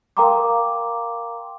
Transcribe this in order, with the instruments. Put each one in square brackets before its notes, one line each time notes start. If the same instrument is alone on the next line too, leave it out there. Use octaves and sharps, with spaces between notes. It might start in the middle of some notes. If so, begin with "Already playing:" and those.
[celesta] A#4 F5 G5 A#5 C6 D6